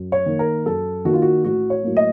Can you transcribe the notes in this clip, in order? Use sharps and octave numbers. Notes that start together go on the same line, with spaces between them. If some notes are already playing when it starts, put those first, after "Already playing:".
Already playing: F#2
C#5
D#3 A#3
A#4
F#2 A4
D#3 A#3 F#4
F4
F#4
A1 F#4
C#5
A2 F#3 A#3
D#5